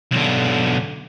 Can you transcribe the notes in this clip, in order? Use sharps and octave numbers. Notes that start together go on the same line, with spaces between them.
B1 D3